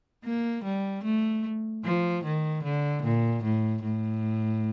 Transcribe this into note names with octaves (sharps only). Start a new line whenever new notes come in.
A#3
G3
A3
F3
D#3
D3
A#2
A2
A2